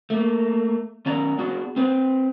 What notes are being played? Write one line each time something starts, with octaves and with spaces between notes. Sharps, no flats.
A3 A#3
D#3 B3 C#4 D5 A#5
B3 D4 F#4 G#4
C4 B4 C5